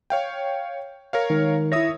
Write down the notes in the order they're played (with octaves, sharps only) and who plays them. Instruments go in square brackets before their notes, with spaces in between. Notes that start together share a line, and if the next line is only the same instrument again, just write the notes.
[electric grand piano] C#5 F5 G5
A#4 C#5 F5
[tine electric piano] D#3 G#3
[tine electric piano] E4 A#6 [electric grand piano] C#5 E5 D#6